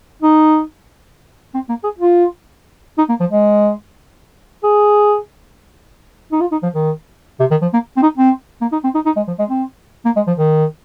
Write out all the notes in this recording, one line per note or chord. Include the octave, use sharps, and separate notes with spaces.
D#4
C4
A#3
G#4
F4
D#4
A#3
F3
G#3
G#4
D#4
F4
D#4
F3
D#3
C3
D#3
F3
A#3
C4
D#4
C4
A#3
D#4
C4
D#4
D#4
G#3
F3
G#3
C4
A#3
G#3
F3
D#3